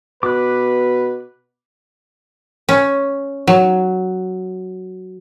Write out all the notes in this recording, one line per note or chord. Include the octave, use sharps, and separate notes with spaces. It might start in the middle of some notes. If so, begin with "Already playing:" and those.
B2 B4 D6 F#6
C#4
F#3